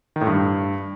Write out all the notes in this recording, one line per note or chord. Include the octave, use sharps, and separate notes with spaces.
D#3
A2
G2